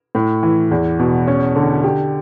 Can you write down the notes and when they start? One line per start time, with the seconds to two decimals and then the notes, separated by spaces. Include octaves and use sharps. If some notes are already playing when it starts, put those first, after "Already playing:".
0.15 A2
0.43 E3
0.71 E2
0.99 B2
1.28 C#4
1.56 D3
1.84 G4